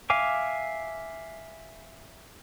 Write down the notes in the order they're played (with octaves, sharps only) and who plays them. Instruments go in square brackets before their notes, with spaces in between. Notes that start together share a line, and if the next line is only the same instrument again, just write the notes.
[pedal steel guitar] E5 F5 G#5 D6